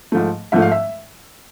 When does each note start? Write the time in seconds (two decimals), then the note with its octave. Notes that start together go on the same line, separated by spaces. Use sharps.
0.12 G#2 F3 A3
0.52 G#2 F3 A3 E5
0.62 F5
0.72 E5